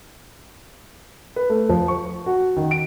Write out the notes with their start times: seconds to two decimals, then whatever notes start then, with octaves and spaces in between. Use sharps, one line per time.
1.36 B4
1.50 A3
1.69 F3
1.88 C#6
2.26 F#4
2.57 D#3
2.71 D7